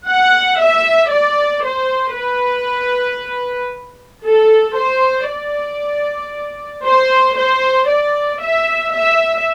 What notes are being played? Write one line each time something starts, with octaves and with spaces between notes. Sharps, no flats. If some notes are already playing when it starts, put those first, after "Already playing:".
F#5
E5
D5
C5
B4
A4
C5
D5
C5
C5
D5
E5
E5